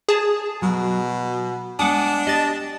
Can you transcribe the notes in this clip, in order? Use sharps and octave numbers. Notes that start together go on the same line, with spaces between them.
G#4 A5
B2 F#3
G#3 B3 D4 F#5 G#5 D6 D#6
G4 D#5 A6